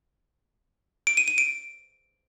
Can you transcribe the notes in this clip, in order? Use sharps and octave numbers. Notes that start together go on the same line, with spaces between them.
D7
D#7
D#7
D7